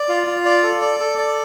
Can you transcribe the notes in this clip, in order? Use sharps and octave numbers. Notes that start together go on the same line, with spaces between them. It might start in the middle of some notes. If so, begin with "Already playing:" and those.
Already playing: D5
F4
F4
D5
A4
D5
A4
D5